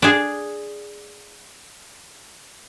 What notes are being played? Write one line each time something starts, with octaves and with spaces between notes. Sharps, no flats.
D4 G#4